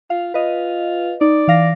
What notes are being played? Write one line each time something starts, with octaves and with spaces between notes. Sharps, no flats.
F4 F5
F4 B4 D#5
D#4 D5
E3 F5 A#6